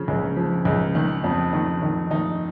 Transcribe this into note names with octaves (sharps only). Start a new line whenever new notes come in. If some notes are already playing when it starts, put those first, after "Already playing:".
Already playing: C#3 F3
C#2
F3
C#2
D#3
F2
D#3
D#3
D#3 D#4